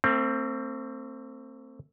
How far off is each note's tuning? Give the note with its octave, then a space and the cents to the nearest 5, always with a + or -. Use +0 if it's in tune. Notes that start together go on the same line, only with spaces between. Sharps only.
A3 +45 C4 +10